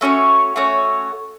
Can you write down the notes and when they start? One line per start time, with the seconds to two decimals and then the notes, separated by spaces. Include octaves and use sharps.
0.01 A3 C#4 F#4 C#5
0.56 A3 C#4 F#4 C#5